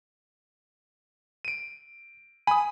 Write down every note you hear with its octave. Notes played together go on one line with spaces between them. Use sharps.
D7 D#7
G#5 B5 D#6